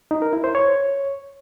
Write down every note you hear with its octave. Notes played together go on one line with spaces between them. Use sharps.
D#4
A#4
E4
C5
C#5